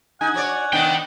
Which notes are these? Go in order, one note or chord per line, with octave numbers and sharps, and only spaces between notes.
D#4 F#5 G#5
F#4 C#5 D5
B3 D4 D#4 D#5 G5